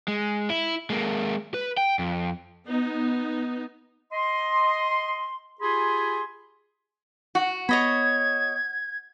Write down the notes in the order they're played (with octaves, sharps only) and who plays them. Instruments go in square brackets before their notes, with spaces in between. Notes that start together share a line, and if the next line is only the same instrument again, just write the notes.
[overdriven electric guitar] G#3
E4
G#3 A#3
B4
G5
F2
[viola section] B3 D#4
[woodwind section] D#5 C6
F4 G4 G#4 G#5 B5 C6
[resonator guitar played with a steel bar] F#4
[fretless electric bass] B3 [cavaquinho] C#5 D#5 B5 [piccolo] G#6